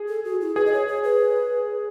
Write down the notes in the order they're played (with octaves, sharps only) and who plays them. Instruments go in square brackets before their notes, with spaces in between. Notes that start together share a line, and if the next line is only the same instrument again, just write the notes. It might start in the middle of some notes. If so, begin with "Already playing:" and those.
Already playing: [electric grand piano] G#4
[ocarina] A4
F#4
E4
[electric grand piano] G#4 [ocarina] B4
[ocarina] D#5
C#5
C#5
B4